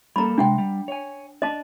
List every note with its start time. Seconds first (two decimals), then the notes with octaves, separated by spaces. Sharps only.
0.16 G3 A#3 A4 A#5 B5
0.38 C3 G#3 D4 F#5 G5
0.58 G3
0.88 C#5 G#5
1.42 D4 D#5 A5